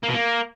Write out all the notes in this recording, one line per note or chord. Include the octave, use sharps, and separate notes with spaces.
A#3
B2
A#3